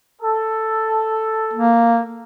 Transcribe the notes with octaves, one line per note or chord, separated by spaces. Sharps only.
A4
A#3